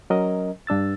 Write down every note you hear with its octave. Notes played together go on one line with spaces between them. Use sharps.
F#3 C#4 A#4 D#5
G2 D4 E6 A6